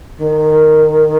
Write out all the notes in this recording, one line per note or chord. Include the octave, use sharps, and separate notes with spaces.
D#3